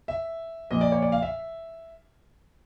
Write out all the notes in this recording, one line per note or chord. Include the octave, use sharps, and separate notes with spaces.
E5
A#2 F3 D#5
D5
C#5
D5
F5
E5